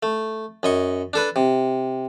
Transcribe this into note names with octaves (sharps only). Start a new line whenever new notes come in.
A3
F#2 D#5 C#6
D4 A4 B4
C3